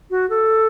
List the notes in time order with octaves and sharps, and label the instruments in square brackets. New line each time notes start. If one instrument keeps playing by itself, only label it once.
[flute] F#4
A4